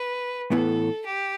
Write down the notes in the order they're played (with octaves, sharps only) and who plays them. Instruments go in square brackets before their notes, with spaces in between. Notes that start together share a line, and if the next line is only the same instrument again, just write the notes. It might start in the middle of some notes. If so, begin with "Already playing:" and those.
Already playing: [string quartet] B4
[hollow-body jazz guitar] A2 E3 B3 [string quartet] A4
[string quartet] G4